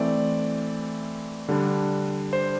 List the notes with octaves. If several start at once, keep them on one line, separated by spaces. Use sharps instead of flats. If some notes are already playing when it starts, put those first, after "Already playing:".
Already playing: E3 A3 C4 D5
D3 G3 D4
C5